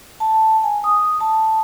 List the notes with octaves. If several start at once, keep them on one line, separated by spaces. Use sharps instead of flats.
A5
A5
G#5
D#6
A5